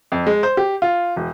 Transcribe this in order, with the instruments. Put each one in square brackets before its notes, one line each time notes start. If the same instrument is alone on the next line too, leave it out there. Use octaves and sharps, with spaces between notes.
[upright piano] F2
G#3
C5
G4
F4
E1